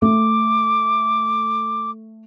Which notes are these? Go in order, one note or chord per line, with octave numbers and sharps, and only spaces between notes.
A3 D6